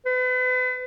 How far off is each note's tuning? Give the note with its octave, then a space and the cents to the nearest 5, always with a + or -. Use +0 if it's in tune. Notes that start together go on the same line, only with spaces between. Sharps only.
B4 +40